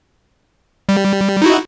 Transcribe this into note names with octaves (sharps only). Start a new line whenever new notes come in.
G3
D#4 E4 F#4